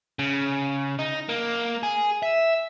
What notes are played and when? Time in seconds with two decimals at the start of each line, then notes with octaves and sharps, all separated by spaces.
0.19 C#3
0.99 D#4
1.29 A#3
1.83 G#4
2.23 E5